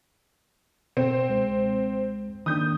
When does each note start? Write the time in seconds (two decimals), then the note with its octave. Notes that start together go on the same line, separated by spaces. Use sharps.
0.97 B2 C4
1.30 C#2 G#3
2.46 D#3 A#3 D4 D#6 G6